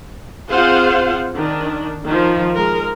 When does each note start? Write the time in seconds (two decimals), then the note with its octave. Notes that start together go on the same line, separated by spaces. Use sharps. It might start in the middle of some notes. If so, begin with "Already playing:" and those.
0.50 C4 F4 G#4 C5 F5 F#5
1.35 D#3 D4
2.06 D#3 F3
2.55 G#3 A#4